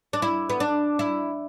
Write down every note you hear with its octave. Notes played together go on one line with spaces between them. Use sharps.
D4
E4
B3
D4
E4